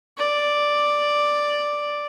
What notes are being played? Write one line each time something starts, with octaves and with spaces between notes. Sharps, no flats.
D5